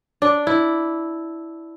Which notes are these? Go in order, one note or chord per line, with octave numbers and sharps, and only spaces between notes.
D4
E4